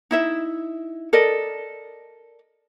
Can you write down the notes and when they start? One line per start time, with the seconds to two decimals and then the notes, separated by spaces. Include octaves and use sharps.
0.11 D#4 E4 E5
1.13 A4 A#4 D5 D#5